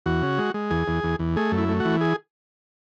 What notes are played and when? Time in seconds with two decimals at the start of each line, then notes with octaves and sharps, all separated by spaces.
0.06 E2 F#4
0.23 C#3
0.38 G#3
0.54 G#3
0.70 E2 G#4
0.88 E2
1.03 E2
1.19 E2
1.36 A3 G#4
1.52 F#2
1.58 E4
1.69 A3
1.80 E3 F#4
2.01 G#4